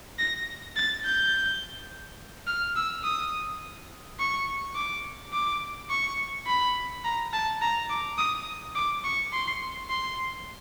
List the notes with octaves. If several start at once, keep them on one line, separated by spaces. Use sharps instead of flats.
A#6
A6
G6
F6
E6
D#6
C#6
D6
D6
C#6
B5
A#5
A5
A#5
D6
D#6
D6
C#6
C6
C6